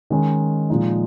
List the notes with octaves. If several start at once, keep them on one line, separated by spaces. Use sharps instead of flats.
D#3 G#3 C#4
A#2 F3 G#3 D#4